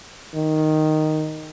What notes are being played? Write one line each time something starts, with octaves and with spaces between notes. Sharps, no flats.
D#3